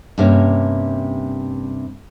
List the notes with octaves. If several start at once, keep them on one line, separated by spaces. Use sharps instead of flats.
G2 C3 A#3 C#4